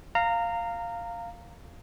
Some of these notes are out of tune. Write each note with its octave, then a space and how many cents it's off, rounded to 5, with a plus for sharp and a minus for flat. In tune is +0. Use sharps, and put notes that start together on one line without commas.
F5 +0 A#5 -20